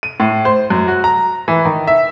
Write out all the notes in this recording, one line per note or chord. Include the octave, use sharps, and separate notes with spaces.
D#7
A2
C5
F#2
F#4
A#5
E3
D#3
E5